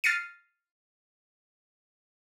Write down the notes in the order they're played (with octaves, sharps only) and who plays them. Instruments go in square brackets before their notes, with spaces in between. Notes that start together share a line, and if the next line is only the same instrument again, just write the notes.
[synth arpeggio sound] F6 A6 A#6 C7 C#7 D#7